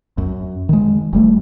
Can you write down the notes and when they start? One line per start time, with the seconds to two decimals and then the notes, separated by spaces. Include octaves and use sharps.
0.18 F#2
0.69 D#3 G#3
1.13 F#1 G3 A3